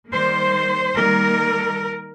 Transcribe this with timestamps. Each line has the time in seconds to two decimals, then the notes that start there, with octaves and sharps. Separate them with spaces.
0.11 D#3 G3 A#3 C5
0.96 D#3 G3 A#3 A#4